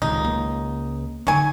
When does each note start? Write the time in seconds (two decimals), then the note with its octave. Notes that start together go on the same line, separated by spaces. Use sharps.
0.02 C#2 C3 D#3 D#4
0.25 A#3
1.27 D3 F#3 D#4 G#5